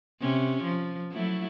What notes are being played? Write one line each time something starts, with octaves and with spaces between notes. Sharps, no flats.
C3 C#4
F3
F#3 A3 E4